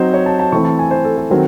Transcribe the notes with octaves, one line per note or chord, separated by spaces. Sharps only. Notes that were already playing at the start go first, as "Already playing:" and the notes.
Already playing: F#3 C4 D#4 C5
C#5
A5
A5
E3 A3 C4 E4 C#6
A5
G#5
C5
A4
A4
D#3 F#3 C4